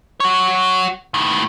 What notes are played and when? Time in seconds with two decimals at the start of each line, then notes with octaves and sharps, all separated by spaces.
0.20 F#4 C#5
1.14 A2 D#3